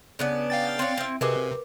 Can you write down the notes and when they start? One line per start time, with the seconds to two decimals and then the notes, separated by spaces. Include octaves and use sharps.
0.19 C#3 B3 D4
0.50 F5 G5 A6
0.79 C4 D4 C#5
0.98 C4 E4
1.21 C3 F#4 G#4 A#4 B4 D#5 D6